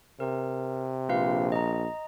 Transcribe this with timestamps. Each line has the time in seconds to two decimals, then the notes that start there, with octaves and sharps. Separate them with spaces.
0.20 C3 A#4
1.09 A#1 F4 B4 F5
1.52 D#5 A#5